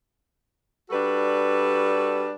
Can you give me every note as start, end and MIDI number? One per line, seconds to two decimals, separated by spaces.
0.90 2.32 55
0.90 2.32 62
0.90 2.32 66
0.90 2.32 69
0.90 2.32 71